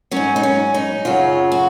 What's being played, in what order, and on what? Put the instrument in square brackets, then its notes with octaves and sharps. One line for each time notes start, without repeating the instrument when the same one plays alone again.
[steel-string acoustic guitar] G#2 F#3 C#4
D#4
C#4
D#4
F#2 C#3 F#3 F4
F#4